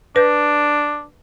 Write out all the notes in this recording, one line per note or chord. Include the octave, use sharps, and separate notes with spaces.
D4 B4 G6